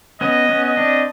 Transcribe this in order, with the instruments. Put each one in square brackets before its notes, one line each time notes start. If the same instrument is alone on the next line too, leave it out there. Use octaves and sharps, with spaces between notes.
[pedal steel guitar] B3 C#4 [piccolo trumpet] D#5
[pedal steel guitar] B3 C#4
[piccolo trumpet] D#5
[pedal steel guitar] C4 D4